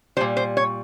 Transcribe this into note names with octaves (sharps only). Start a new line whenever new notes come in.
A#2 G3 C5
C5
C#5